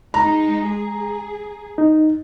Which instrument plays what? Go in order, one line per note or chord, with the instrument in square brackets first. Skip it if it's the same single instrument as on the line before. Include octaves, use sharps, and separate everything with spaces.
[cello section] G#3 D#4 [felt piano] A#5
[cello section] G#4
[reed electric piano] D#4